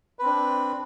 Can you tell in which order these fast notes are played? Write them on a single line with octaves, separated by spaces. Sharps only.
B4 C4 D4